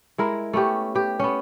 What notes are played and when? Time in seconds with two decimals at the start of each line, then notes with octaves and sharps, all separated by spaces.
0.18 G#3 E4 A#4
0.53 A3 B3 C#4 G4
0.95 G4 B4
1.19 B3 C#4